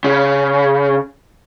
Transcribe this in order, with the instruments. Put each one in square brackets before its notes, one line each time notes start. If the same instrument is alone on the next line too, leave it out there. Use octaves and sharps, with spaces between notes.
[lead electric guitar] C#3